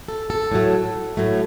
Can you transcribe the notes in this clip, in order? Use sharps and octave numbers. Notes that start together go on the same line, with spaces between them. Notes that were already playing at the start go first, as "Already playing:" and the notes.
A4
A4
A2 F#3 A3
A2 F#3 A3